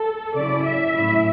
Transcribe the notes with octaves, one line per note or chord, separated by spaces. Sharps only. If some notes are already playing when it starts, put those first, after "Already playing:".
Already playing: A4
C#3 F#3 C#4 E4 D5
E5
A2 F#3 C#4 E4